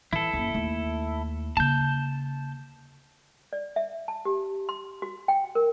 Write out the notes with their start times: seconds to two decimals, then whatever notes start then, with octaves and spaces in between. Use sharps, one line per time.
0.13 E3 E4 A4
0.34 F#2 A#3
0.54 D#2 A3
1.57 C#3 A#3 A5 G6
3.53 D5
3.76 E5
4.08 A5
4.25 G4
4.69 C6
5.02 F#4
5.28 G5
5.55 A#4